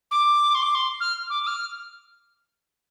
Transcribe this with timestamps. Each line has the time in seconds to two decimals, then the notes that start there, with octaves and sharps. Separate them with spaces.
0.11 D6
0.55 C6
0.63 D6
0.75 C6
1.00 F6
1.30 D6
1.43 D6
1.47 F6